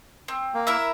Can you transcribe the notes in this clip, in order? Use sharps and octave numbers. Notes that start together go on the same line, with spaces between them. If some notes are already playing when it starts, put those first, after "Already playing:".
C4
A#3
E4 A#4 E5